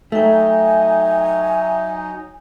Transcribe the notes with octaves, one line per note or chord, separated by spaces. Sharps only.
F#3 A3 D#4 E5 G5 G#5